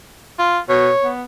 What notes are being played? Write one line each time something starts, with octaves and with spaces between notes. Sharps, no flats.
F4
B2 C#5
B3